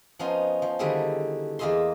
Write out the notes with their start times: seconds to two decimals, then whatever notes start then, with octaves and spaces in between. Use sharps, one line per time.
0.19 F3 B3 C#4 D#4 C6
0.62 F3
0.79 D3 D#3 G3 A3 E4 G#4
1.59 E2 A#3 G#4 D#5 E5 C6